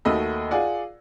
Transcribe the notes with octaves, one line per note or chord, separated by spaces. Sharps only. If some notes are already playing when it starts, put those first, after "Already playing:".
D#2 A3 F#4 D#5 B5 E6
F4 G#4 D5 F#5